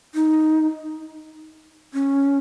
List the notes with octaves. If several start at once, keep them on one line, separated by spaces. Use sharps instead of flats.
D#4
C#4